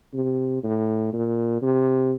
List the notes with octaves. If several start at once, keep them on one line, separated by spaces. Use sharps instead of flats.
C3
A2
A#2
C3